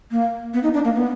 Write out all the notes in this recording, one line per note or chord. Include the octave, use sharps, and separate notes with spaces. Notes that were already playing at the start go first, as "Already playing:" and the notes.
A#3
B3
D#4
D4
A#3
B3